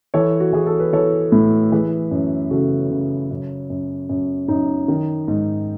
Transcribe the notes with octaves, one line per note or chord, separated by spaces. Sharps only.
E3 A4 C#5
F#4
E3 G#4
A4
B4
E3 A4 C#5
A2
E3 G#4 B4
F#2
C#3 F#4 A4
C#3
F#2
F#2
F#2
F#2 D#4
D#3
G#2